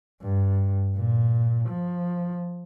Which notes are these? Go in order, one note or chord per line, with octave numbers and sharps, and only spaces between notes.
G2
A#2
F3